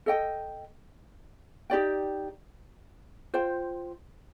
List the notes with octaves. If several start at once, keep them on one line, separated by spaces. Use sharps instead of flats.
A4 D#5 G5
D#4 G4 D5 G5
F4 C5 G5